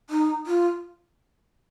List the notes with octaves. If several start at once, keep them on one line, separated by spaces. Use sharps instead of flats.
D#4
F4